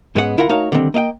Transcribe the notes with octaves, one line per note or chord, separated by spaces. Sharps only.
G#2 G#3 B3 C#4 B4 F#5
D2 E4 F4 A#4 F#5 A#5
A3 D#4 F#4 A#4 C#5 F5
D3 D#3 G3 A#3 C4
A#3 D#5 F5 G5